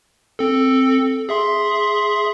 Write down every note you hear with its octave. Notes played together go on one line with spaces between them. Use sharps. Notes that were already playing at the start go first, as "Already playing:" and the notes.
C4 A4
G#4 E5 C6